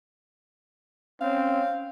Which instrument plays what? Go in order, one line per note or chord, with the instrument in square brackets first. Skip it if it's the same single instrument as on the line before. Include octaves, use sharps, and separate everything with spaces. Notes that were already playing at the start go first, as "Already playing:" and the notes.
[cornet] C4 [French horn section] C#4 [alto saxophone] F5